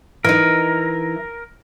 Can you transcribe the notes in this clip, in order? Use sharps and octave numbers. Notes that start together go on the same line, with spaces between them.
E3 D#4 A#4